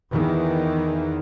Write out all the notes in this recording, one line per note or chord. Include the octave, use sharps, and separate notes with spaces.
E2 D#3 E3